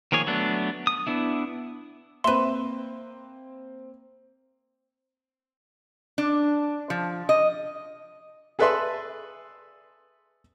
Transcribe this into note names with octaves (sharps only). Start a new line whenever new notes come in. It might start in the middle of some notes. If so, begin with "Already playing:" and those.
D#3 F3 A#3 G#4 C#5
F#3 A3 B3 D4
D#6
B3 D4 E4
A#3 C4 B4 E5 C6
D4
F3
D#5
G#4 A4 B4 D5 E5 C6